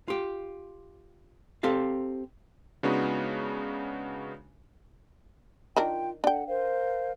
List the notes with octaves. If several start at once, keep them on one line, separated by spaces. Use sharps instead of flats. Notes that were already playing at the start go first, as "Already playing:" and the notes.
F4 G4
C4 G4 A4 F5
C#3 G#3 B3 D4 D#4 F#4
D#3 D4 F4 A#4 G5
D4 A4 F#5 G5
A#4 C5 F5